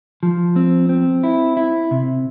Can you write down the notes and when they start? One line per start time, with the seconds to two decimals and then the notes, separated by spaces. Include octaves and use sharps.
0.23 F3
0.56 C4
0.89 C4
1.23 E4
1.57 E4
1.91 C3